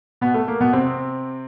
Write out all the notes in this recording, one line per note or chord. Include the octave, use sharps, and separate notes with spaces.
B2 B3
A3
A#3
B2 B3
C3 C4